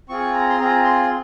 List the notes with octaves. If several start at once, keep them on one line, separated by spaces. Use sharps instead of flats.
C4 F4 G#4 C#6
A#5
C6
C4 F4 G#4 A#5
C6